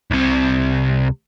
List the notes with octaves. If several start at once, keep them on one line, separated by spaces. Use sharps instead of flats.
C2 C3